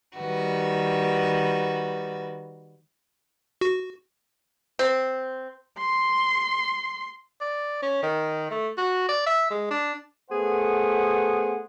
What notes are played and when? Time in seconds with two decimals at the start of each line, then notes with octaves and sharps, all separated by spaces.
0.17 D#3 G3 F#4 B4
3.61 F#4
4.79 C4
5.79 C6
7.41 D5
7.83 C#4
8.03 D#3
8.51 A3
8.77 F#4
9.09 D5
9.27 E5
9.50 G#3
9.71 D4
10.30 A3 B3 G#4 C5 F#5